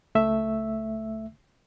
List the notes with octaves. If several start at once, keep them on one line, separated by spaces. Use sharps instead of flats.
C#2 A3 E5 E6